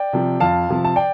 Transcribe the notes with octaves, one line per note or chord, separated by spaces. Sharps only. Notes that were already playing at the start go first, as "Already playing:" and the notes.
Already playing: D5 G5
C3 F3
F2 F5 A5
C3 F3
A5
D5 G5